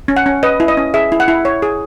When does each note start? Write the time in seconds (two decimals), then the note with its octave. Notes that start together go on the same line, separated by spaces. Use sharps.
0.08 C#4
0.17 F#5
0.26 C#4
0.43 B4 D#5
0.60 E4
0.68 D#5
0.77 C#4
0.94 G#4 E5
1.12 E4
1.20 F#5
1.28 E4
1.45 C#5
1.62 G#4